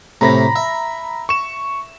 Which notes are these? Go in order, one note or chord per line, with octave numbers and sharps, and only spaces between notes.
A2 C3 A#5 B5 A#6
E5
C#6 E7